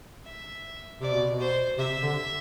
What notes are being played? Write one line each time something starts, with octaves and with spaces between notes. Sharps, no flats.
E5
C3 D5
B2
B2
C5
C3 E5
D3